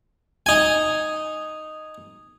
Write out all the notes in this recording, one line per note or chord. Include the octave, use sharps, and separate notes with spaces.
D#4 G#5